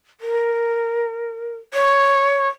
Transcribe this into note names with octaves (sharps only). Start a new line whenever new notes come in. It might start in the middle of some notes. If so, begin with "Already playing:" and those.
A#4
C#5